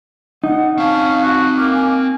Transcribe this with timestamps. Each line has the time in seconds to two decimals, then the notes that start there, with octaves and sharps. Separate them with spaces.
0.44 D#4 F#5
0.78 C4 C#4 F5 A5
1.20 F#4
1.57 A#3 D6
1.74 G#5